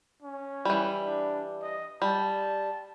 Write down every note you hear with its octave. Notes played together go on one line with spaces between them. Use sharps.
C#4
E3 G3
D4
D#5
G3 A5